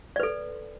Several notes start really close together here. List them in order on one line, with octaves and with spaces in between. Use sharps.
D5 B4 A4